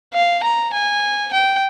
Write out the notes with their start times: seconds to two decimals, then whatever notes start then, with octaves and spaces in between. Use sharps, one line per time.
0.14 F5
0.43 A#5
0.73 G#5
1.33 G5